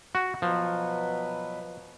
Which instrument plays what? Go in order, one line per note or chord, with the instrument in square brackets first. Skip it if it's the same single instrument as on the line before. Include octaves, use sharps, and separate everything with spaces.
[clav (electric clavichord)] F#4
[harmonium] B2 F#3 B4 [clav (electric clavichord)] F3